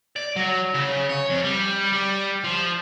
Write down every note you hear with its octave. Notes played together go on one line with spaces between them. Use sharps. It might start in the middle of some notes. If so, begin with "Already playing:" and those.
D5
F#3
C#3
C#5
F2
G3
G3
F3